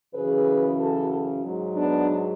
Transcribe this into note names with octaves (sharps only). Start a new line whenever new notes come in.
F#2 C#3 E3 G#4 B4
F#4 A4
G#2 F#3
B3 D4